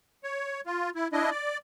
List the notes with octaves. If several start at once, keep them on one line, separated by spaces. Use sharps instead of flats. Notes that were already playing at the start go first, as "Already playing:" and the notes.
C#5
F4
E4
D4 E4 D#5
D5